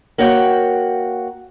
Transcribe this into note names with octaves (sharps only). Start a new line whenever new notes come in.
A#3 F#4 C#5 F#5 G5